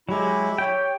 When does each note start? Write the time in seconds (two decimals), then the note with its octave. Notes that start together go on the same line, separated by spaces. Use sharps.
0.09 F#3 G#3 E4 G4
0.58 G4 C#5 G5